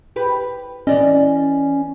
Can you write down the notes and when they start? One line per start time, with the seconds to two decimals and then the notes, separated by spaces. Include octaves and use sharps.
0.16 G4 B4
0.87 E3 C#4 D5 D#5